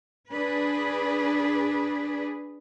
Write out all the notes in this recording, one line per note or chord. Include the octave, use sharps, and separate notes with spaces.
D4 G#4 B4